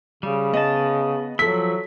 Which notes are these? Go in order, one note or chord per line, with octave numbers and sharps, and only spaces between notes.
C#3 G3
B3 D#5 A5
F3 F#3 A4 E5 B6